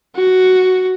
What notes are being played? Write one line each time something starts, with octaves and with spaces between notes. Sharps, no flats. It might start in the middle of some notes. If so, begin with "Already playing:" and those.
F#4